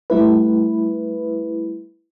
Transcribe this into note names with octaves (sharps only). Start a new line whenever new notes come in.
G3 A3 E4 B4